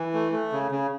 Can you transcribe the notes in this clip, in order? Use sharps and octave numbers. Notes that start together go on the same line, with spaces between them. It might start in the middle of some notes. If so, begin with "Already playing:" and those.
Already playing: E3
A3
A3
C#3
C#3